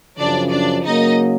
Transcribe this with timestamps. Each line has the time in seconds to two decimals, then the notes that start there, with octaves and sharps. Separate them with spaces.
0.18 F#2 C#3 F3 D4 D5
0.51 D4 D5
0.84 C#3 F#3 A#3 D#4 D#5